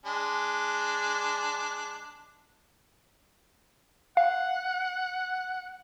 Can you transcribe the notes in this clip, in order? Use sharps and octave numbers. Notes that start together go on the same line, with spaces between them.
G#3 D4
F5 F#5